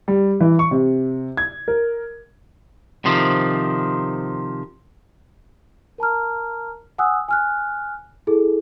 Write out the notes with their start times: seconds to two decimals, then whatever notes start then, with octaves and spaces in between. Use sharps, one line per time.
0.08 G3
0.41 E3
0.59 C#6
0.71 C3
1.37 G#6
1.68 A#4
3.05 C3 D#3 F3
5.98 A#4 A5 A#5 F6
6.98 F#5 G#5 D#6 E6 F#6
7.29 G#5 F6 F#6
8.27 E4 G#4 A4